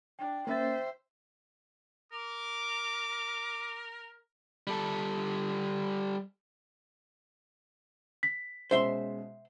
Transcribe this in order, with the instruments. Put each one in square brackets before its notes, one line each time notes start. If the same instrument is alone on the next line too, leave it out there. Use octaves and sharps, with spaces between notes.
[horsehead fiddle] D4 [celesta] G5
[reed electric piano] A#3 C#4 A6 [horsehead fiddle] C5 E5
[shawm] A#4 [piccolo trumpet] D6
[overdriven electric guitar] G3 A4
[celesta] B6
[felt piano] B2 G#3 C#4 [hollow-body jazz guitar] C5 E5 C6